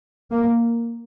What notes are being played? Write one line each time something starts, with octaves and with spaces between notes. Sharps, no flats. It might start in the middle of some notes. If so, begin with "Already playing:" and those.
A#3